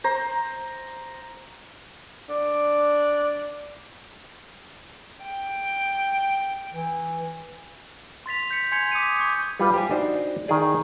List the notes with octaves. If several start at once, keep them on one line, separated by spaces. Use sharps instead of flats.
C5 A#5
D4
G5
E3
C6 A6 B6 F7
G6 B6 C#7
G#5 C6 G#6 C#7 F7
D6 D#6 B6 C#7 D#7
C#6 D6 G6 G#6 C#7
G3 F4 B4
G4 C5 G#5
D4 D#4 F#4 C5
D#3 D#4 G#4 D5